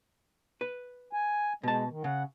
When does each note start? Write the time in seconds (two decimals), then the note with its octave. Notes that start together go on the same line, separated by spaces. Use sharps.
0.61 B4
1.13 G#5
1.63 B2 G#3 A5
1.89 D#3
2.04 C#3 F#5